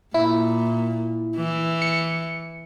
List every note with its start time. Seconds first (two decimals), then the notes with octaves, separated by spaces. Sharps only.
0.14 A#2 E4
1.36 E3
1.82 C#7